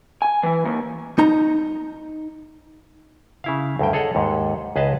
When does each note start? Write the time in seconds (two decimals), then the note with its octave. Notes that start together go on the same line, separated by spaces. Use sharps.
0.22 G#5
0.43 E3
0.65 D#2
1.18 D#4 A#5
3.44 C#3 E4 F5
3.79 D2 G2 G5
3.93 G#4 A4 C#5 D#5 F#5
4.15 D#2 G#2
4.76 C#2 G#4 B4 D#5 A5